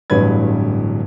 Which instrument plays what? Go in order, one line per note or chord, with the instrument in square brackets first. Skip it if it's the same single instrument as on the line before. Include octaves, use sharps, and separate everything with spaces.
[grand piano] D1 A1 G2 B4 G#6